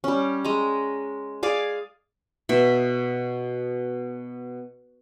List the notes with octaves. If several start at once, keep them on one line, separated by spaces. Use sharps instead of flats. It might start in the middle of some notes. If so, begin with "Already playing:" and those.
G3 C#4
G#3 D#5 A#5
G#4 D5 F5
B2 E5